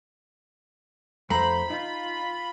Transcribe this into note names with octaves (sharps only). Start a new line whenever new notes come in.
F2 A3 C5 A#5 B5
D#4 F4